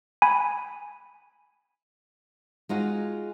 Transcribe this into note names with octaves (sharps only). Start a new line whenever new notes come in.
G#5 B5
G#3 D#4 F4 F#4